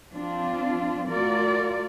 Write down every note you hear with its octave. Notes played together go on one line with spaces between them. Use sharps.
F3 C4 D4 F4
A3 F4 F#4 A#4 D5